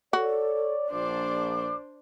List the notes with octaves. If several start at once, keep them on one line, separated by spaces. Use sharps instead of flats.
F#4 A4 C#5 D5
A#1 D4 C5 D5 D6